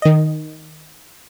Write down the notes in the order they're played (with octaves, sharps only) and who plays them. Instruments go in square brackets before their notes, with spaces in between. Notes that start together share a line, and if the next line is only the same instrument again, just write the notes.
[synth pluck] D#3 D#5